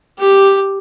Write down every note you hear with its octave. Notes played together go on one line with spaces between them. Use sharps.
G4